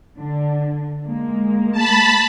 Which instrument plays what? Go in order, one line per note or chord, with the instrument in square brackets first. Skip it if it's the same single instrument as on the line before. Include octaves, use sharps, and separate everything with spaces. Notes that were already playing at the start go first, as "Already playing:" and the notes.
[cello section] D3 D4
G#3 A#3
[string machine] A5 B5